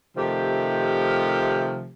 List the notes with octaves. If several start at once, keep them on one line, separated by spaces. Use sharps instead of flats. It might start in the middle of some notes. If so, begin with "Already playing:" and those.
C3 D#3 F3 A3 G4